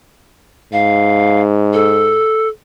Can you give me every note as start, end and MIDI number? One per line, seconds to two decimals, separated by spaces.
0.73 2.27 44
0.73 1.41 77
1.73 2.48 69